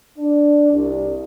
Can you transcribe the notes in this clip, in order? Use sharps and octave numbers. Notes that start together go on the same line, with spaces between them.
D4
C2